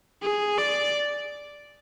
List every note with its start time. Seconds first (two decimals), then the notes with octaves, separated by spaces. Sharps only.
0.22 G#4
0.58 D5